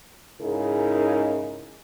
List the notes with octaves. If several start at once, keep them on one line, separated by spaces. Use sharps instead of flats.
G#2 C#3 D#4 E4 G#4 A#4